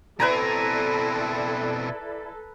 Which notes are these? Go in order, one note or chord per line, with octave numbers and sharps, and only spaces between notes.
B2 C4 E4 A4 B4 D5 G#5 A#5